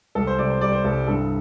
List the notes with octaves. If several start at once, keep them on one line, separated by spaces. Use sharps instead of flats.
C2 A4
C5
C3 D5
C5
G3 D5
C5
C2 A4
G2 A4